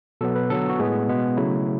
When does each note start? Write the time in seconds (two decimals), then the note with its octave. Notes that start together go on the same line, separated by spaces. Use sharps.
0.21 B2 F#3 B3 A4
0.35 B4
0.50 D3 F#3 B3 A4
0.70 F#4
0.79 A2 G#3 B3 G#4
1.08 B2 G#3 B3
1.37 C#3 F#3 A3 E4